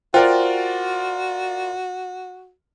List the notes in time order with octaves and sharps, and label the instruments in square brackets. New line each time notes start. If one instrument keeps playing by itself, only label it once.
[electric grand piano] F4 A#4 D5 [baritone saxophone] F#4 [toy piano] C5 G5